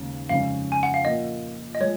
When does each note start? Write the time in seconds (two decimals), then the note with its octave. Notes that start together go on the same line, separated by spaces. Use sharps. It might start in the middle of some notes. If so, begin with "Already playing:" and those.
Already playing: D#2 C#3 G#3
0.29 F2 C#3 F3 G#3 C#4 F5
0.72 G#5
0.83 F#5
0.94 F5
1.05 A#2 F3 A#3 F4 D#5
1.75 D#5
1.80 F3 G#3 C#5